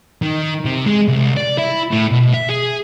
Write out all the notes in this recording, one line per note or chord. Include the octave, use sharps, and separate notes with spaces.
D#3
C3
G#3
C2
D5
E4
A2
B2
E5
G#4